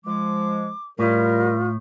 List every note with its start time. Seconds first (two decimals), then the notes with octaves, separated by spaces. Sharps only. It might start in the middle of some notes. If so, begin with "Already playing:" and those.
0.05 F3 G#3 D6
0.99 A2 G3 F4 A#4